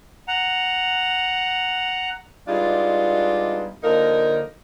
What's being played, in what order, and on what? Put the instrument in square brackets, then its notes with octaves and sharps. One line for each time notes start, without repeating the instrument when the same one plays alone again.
[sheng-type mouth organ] F#5 A#5
[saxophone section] G3 G#3 B3 D4 D#4 F4
D3 F3 A#3 D#4 A#4